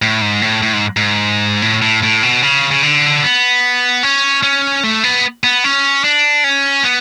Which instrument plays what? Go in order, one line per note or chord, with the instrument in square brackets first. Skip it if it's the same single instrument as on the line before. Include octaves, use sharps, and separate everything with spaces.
[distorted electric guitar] A2
G#2
A2
A2
G#2
G#2
A2
A2
A2
B2
C#3
C#3
D3
B3
C#4
C#4
A3
B3
B3
C#4
D4
C#4
B3